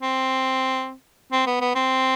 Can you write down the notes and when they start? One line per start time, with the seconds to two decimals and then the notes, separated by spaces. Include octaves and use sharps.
0.01 C4
1.32 C4
1.47 B3
1.61 B3
1.75 C4